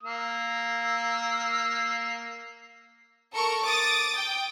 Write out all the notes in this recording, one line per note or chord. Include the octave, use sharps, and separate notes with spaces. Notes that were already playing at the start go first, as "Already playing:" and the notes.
A#3 E6
A4 A#4 C#6 C#7
D6 D#6 A6
G5